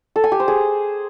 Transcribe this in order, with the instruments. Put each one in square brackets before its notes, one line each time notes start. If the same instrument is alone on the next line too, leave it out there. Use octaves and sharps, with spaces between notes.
[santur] A4
G#5
G4
C5
G#4